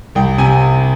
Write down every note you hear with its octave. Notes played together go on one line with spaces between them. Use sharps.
C2 G5
C3 G#5